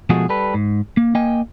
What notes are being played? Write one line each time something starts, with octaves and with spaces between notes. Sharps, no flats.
B2 F3 G#3 A3 F#4 G#4
G3 A4 B4
G#2
A#3
A#3 D#5 G5 G#5